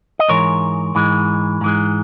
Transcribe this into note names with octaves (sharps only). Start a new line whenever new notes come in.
D#5
G#2 E3 G#3 A#4 C#5
G#2 E3 G#3
G#2 E3 G#3